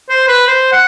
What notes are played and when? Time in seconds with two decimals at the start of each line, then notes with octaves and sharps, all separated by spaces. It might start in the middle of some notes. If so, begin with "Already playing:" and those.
0.10 C5
0.28 B4
0.48 C5
0.72 F#5